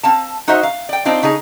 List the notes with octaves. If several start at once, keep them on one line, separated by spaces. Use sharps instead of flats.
C4 F5 A5
D#4 F#4 C5 D#5 E5
F5
D5 G5
C4 D4 D#4 F4
C#3 D#4 G#4 G#5